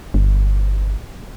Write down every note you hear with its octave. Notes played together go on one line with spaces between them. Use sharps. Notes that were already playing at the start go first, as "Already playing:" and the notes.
G1